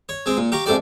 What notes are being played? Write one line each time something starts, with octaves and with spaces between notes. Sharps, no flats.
C#5
G#3 C4
A#2
G4 F5 A#5 C#6
F2 G#2 A3 G4 D5